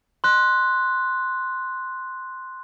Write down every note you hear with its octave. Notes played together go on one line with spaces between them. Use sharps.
C6 F#6